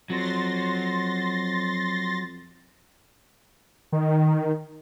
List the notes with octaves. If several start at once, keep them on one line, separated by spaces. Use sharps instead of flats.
F2 F#3 C6 A6 A#6
D#3